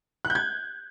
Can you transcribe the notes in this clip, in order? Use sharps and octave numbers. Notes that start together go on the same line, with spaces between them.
F#6
G6
G#6